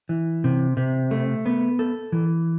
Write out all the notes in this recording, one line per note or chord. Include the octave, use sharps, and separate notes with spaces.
E3
C3
C3
A3
B3
A4
E3